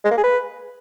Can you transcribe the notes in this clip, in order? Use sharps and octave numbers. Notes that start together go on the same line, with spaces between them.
G#3
A#3
G#4
B4